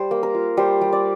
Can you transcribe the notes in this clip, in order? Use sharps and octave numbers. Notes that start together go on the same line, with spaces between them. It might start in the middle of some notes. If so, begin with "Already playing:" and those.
Already playing: G3 C5
A#3
A#4
F4
G3 C5
G3
D5